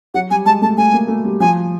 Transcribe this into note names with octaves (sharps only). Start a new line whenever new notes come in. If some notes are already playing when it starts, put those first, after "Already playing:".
F#3 F#5
G3 G#5
G#3 A5
A3 A5
A3 G#5
A#3
A3
G3
F3 G#5